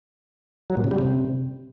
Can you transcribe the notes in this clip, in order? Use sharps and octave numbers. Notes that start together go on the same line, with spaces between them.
F#3
A#2
C#3
G3
C3